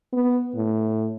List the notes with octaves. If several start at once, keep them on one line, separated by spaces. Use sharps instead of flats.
B3
A2